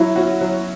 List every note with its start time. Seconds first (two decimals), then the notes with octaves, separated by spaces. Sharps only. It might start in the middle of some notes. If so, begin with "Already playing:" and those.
Already playing: F#3 E4
0.16 C#4 F#4
0.41 F#3